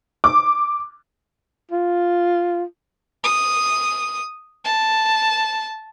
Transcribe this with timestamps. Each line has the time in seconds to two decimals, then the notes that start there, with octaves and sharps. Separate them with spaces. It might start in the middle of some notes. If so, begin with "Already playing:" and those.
0.24 D6
1.71 F4
3.24 D#6
4.64 A5